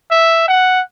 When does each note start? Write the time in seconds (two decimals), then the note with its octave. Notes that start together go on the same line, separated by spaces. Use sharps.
0.11 E5
0.48 F#5